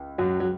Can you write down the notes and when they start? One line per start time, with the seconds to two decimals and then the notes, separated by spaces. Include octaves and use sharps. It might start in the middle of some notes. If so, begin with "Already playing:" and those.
Already playing: C#2
0.18 F#2 F#3
0.40 F#3